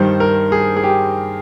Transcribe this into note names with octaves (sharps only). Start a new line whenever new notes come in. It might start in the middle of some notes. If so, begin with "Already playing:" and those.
Already playing: G2 D#3 G3 C5
A#4
G#4
G#4
G4